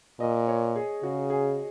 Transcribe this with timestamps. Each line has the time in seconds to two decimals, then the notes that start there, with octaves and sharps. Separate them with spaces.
0.20 A#2 D#5
0.48 C#5
0.76 G#4
1.03 C#3 F#4
1.30 G#4